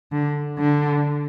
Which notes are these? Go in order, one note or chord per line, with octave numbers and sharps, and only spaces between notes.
D3
D3